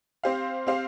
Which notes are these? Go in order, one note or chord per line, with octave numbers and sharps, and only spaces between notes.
C4 G4 C5 F5
C4 G4 C5 F5